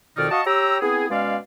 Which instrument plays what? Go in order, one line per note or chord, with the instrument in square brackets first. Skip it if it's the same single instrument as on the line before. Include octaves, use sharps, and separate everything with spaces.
[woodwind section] F2 B2 D#3 D#4 D5 F6
F#4 D#5 F5 A5 C#6 D#6
G4 C#5 G5 A#5 E6
B3 C4 E4 G#4
B2 G#3 C#4 D5 F5